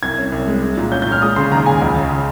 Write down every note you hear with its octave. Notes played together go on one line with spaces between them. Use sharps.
C2 G#6
C#4
C2
G#3
G#3
A#2
C#4 G6
G6
A#2
F6
G#3 D#6
C#3 C6
D#2 A#5
C#3 G#5
C#2
C#3